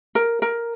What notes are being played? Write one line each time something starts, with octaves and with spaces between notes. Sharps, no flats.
A#4
A#4